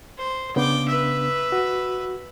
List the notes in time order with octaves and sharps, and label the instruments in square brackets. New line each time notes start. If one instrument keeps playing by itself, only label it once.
[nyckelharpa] C5
[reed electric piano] C#3 B3 D4 [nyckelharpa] G5 D6
[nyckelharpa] B4 E5
[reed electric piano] F#4